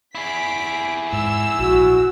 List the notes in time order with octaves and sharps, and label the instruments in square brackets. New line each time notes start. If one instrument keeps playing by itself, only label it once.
[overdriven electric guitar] E4 G#4 [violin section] B6 D7
[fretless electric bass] G#2 [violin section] E6
[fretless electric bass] A#1 [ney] F#4